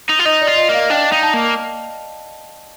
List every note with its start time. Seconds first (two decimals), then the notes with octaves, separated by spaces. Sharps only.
0.09 D#4
0.19 F4
0.25 D#4 D#5
0.42 D5
0.47 F4
0.57 D#5
0.69 A#3 F5
0.90 D4 G5
1.12 D#4
1.23 A5
1.34 A#3